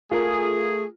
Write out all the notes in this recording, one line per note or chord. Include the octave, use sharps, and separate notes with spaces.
A3 F4 G#4 A#4